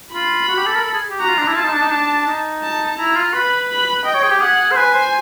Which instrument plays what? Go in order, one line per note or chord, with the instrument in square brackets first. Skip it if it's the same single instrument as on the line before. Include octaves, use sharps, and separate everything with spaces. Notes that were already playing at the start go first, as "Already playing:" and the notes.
[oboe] F4 [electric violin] B5
[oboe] F#4
G4
A4
A#4
A4
G#4
G4
[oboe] F#4 [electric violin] A#5
[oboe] F4
D4
E4
[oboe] F4 [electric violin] A5
[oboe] D#4
D4
D#4
D4
D#4
[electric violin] A5
[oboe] E4 [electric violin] A#5
[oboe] F4
[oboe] B4 [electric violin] B5
[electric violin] B5
[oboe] D#5 [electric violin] G5
[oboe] C#5
G#4
G4
[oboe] G#4 [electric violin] F#5
[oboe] C5
[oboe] B4 [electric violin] G#5
[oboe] C5